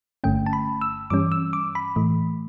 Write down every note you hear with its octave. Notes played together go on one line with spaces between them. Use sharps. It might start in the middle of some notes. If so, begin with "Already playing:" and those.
G1 G2 D3 A3 C#4 G5
A5
B5
E6
G2 E3 G3 C#4 D6
E6
D6
B5
A2 E3 A3